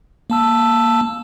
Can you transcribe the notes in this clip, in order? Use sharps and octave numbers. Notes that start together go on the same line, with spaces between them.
A#3 A5 E6